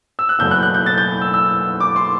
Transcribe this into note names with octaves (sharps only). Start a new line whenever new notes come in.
E6
F#6
F#1 E2 B2 F#3 A3 G6
F#6
F#6
G6
A6
G6
E6
E6
D6
C6